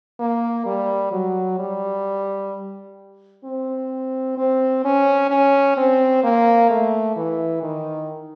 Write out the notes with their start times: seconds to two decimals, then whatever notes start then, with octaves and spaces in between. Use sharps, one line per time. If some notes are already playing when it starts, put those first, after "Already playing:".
0.19 A#3
0.66 G3
1.12 F#3
1.59 G3
3.44 C4
4.37 C4
4.84 C#4
5.30 C#4
5.77 C4
6.23 A#3
6.70 A3
7.16 E3
7.63 D#3